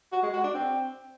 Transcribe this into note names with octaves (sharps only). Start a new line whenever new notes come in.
F#4
G#3
F#4
D4
C4